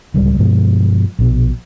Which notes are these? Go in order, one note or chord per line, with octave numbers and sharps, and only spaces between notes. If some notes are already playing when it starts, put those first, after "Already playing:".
D1 C#2 G3
G2 B2 F3 G#3
A#1 B2